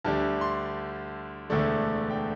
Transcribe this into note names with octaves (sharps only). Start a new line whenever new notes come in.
D2 D3 G3 D4 A5
C6
E1 D2 D3 A3 D4
G5